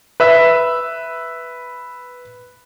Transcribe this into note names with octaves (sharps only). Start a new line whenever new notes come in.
B4 E5 E6